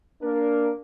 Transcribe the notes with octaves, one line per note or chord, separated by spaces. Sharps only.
A#3 D4 A#4